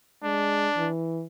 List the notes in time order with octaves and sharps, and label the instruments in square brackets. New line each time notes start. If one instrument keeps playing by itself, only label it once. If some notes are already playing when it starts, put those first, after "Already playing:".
[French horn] G#3 [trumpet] D4
[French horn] E3